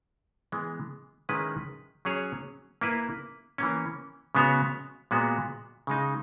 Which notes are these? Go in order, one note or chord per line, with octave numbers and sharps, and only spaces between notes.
E3 G#3 B3
D#3 G#3 C#4 E4 B4
F#3 C#4 G#4 C#5
A#3 E4 B4
E3 A#3 C#4
C#3 G#3 B3 F#4 C#5
A#2 G#3 B3 F#4
C#3 G#3 D#4